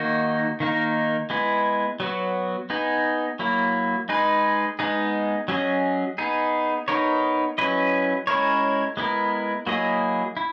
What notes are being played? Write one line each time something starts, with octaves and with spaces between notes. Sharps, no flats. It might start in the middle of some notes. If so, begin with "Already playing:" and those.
Already playing: D#3 A#3 D#4 F#4
D#3 A#3 D#4 A#4
G#3 B3 E4
F#3 B3 F#4
B3 D#4 G#4
F#3 A#3 E4
G#3 D#4 G#4 B4
G#3 B3 D#4 G#4
F#3 C#4 G#4 D#5
B3 D#4 G#4
B3 D#4 A#4 C#5
F#3 C#4 E4 B4 D#5
G#3 C#4 E4 A#4 C#5
G#3 B3 E4 A#4
F#3 A#3 E4 G#4 D#5
E4